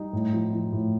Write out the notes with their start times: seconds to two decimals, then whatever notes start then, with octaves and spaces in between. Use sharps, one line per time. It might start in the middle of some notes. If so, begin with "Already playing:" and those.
Already playing: G3 D#4
0.13 A2
0.33 F3
0.53 F3
0.72 A2